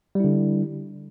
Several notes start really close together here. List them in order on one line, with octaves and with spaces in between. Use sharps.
G3 E4 D3